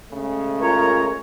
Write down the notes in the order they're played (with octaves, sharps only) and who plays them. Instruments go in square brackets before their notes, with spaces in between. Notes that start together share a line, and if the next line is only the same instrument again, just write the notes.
[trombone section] C#3 G#3 A3
[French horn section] F4 A#4 [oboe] C#5 [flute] A#5